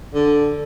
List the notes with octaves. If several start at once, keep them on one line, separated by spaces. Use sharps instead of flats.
D3